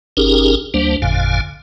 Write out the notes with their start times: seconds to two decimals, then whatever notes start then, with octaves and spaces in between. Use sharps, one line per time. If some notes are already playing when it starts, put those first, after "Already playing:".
0.17 G1 C#4 D#4 G4 G#4 A#4
0.74 D2 G3 A#3 D4 C5
1.02 G#1 F2 A#2 D3 F5 G#5